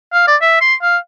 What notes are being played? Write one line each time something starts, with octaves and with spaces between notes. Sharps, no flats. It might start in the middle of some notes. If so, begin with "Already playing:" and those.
F5
D5
E5
C6
F5